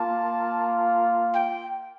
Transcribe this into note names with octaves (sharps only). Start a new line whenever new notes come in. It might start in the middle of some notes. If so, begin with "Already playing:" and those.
Already playing: A#3 F4 A5
G5